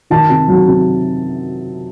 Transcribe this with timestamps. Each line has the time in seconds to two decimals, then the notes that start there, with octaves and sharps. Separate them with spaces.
0.10 D#3 A5
0.30 C3
0.48 F#3
0.67 C3